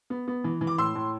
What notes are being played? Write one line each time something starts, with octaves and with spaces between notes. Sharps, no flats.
B3
B3
E3
E3
D6
A2 C6 E6
A2